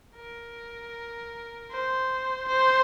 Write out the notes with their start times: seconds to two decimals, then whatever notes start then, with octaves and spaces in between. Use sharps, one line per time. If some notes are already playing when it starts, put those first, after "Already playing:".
0.16 A#4
1.71 C5
2.48 C5